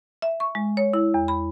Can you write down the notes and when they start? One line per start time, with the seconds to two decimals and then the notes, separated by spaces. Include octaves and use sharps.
0.22 E5
0.40 C#6
0.55 G#3
0.77 C#5
0.93 E4
1.14 E2
1.28 B5